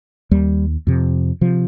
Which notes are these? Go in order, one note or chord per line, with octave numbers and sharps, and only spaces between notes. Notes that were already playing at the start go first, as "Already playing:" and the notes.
D#2 G3
F2 C3
C3 F3